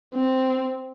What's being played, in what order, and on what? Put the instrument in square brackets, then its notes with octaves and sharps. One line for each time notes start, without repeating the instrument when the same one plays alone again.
[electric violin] C4